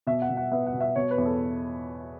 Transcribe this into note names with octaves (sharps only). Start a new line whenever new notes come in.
B2 E5
F#5
B2
F#5
B3 E5
F#5
B2
E5
B2 C#5
B4
E2
A4